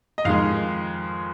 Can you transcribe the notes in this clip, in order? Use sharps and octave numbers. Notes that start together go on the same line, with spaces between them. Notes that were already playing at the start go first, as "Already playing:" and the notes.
D#5
F2 D#3 G#3 F5